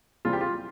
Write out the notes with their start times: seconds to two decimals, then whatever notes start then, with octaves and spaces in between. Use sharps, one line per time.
0.25 C3 E3 G3 C4 F4
0.33 G4
0.41 F4